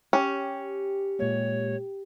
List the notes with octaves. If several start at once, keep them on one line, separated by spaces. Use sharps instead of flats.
C#4 G4
A#2 G#3 A#3 C#5